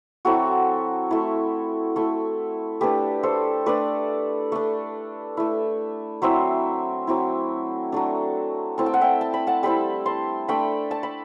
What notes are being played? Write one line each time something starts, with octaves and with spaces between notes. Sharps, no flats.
F#3 C4 E4 F#4 A4
A3 E4
A3 E4
A3 D4 G4 B4
A4 C5
A3 D4 B4 D5
A3 D4
A3 E4
F#3 C4 E4 C5 E5
F#3 C4 E4
F#3 A3 D4
A3 C4 E4 A5
G5
F#5
E5 G5
A5
B5
F#5 A5
G3 C4 E4 G5 B5
A5 C6
A3 D4 G5 B5
A5
B5